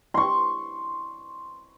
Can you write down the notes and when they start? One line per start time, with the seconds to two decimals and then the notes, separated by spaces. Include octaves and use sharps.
0.14 C6 C#6